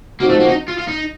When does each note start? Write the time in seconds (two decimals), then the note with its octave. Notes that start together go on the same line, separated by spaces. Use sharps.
0.20 F3 A#3 C4 D#4 F#4
0.30 A3
0.40 A#3
0.49 D#4
0.68 F4
0.78 F4
0.88 D#4